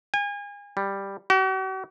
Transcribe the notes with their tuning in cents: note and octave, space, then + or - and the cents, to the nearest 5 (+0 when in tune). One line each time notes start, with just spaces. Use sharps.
G#5 -35
G3 +5
F#4 +45